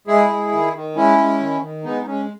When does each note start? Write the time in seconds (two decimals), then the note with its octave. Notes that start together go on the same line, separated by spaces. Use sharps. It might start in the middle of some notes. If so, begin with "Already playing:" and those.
0.07 G#3 E4 G#4
0.29 G#3
0.52 D#3
0.74 D#3
0.96 G#3 C#4 E4
1.18 G#3
1.40 D#3
1.62 D#3
1.83 G#3 B3 D#4
2.01 D#4
2.06 G#3 C#4